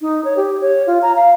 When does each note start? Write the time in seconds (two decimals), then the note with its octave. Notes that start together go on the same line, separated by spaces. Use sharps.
0.01 D#4
0.25 C#5
0.37 G4
0.61 C#5
0.87 F4
1.02 A#5
1.16 F5